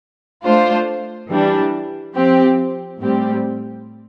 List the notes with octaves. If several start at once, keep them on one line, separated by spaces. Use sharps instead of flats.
A3 D4 F4 C5
E3 G3 D4
F3 C4 G4
A2 G3 C4 G4